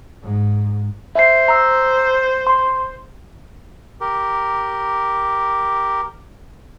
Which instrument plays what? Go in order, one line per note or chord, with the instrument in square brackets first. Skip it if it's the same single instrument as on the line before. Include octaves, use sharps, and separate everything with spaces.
[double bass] G#2
[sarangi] C5 [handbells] E5 C7
[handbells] A#5 E6
C6
[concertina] G4 A#4